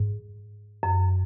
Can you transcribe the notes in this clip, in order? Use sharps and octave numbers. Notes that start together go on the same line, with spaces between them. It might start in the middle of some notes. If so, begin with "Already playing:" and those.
Already playing: G#2
F#2